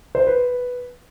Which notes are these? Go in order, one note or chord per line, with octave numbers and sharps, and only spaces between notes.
C5
B4